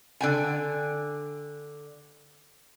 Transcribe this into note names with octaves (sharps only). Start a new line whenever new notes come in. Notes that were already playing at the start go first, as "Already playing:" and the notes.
D3 G5 G#5